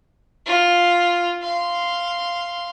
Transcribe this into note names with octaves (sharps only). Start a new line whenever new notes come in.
F4
F5 C6